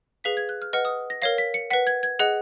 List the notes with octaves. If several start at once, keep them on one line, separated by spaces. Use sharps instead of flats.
G#4 B4 F5 B6
G#6
F#6
F6
B4 D#5 F#5 F6
D#6
A#6
A#4 C#5 F5 A#6
B6
C#7
B4 F#5 B6
G#6
G#6
G#4 D#5 F#5 F#6